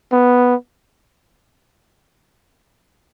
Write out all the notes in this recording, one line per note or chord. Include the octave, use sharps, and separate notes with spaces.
B3